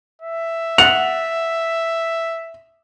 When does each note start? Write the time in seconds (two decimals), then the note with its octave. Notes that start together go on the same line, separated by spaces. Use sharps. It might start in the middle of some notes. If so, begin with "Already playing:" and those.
0.22 E5
0.78 F#5 F7